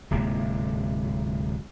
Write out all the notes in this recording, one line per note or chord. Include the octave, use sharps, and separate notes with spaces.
D1 G#2 C3 A#3